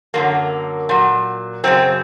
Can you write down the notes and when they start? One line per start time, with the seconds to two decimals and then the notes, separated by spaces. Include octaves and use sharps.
0.14 F#2 D3 F#3 A#3
0.89 A#2 F#3
1.64 F#2 C#3 F#3 C4